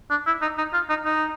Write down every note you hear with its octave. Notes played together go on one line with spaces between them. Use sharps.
D4
E4
D#4
D#4
F4
D#4
D#4